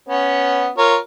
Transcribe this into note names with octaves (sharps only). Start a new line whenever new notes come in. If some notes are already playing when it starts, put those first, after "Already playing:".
B3 C#4
F4 A#4 C#5